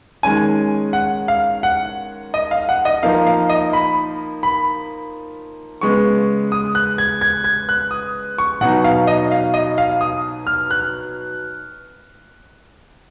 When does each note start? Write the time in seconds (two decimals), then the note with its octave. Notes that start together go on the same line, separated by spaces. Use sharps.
0.23 D#3 G#3 C#4 G#5
0.93 F#5
1.28 F5
1.63 F#5
2.34 D#5
2.51 F5
2.69 F#5
2.85 D#5
3.03 F3 A#3 D#4 F5
3.27 F5
3.49 D#5
3.73 B5
4.43 B5
5.81 C#3 G#3 B3 C#6
6.52 D#6
6.75 F#6
6.98 G#6
7.21 G#6
7.44 G#6
7.69 F#6
7.91 D#6
8.38 C#6
8.61 B2 F#3 B3 D#4 F#5
8.84 F5
9.07 D#5
9.32 F5
9.54 D#5
9.78 F5
10.01 D#6
10.47 F6
10.71 F#6